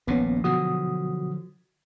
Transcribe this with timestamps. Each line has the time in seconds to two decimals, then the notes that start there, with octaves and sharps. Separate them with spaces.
0.07 D#1 A#1 A#2 B3 C#4
0.44 B2 D3 F3 F#3 F#4 D#6